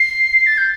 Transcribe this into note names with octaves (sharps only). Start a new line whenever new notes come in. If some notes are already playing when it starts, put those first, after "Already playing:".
Already playing: C7
A6
G6